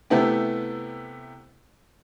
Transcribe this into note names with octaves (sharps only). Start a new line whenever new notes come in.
C3 A3 B3 E4 G4